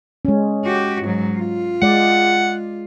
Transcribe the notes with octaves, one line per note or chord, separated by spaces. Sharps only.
G#3 C#4
F#4 G4
G#2 F#3
F4
G#3 D5 F#5